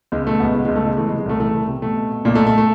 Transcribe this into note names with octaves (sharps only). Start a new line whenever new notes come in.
C#2 G#3
B2 A3
C#2 B2 B3
B2 G#3
C#2 G#3
A3
B2 G#3
E3 A3
G#3
C3
G#3
C2 A3
E3 A3
C2
C3
B2 A3
B2
B2
B1 A#2 A#3
A3
B1
A3
A3